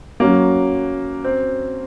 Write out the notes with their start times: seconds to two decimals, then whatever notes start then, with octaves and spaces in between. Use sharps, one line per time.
0.20 F#3 A#3 C#4 F#4
1.24 C4